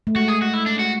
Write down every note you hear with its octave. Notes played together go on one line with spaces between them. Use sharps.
A3
G#3 F#4
G#4
F#4
E4
D4
F#4